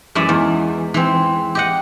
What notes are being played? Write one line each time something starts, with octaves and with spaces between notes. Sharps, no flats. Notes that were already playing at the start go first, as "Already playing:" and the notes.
F#2 E3 G#3 D5 E5
E2
E3 C4
G4 D#5 F#5